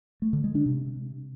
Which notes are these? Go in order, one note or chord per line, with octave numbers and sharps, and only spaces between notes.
A3
D3
G#3
D4
C3